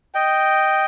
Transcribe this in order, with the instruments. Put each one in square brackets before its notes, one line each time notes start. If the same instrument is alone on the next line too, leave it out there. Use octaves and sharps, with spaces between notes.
[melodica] D#5 G5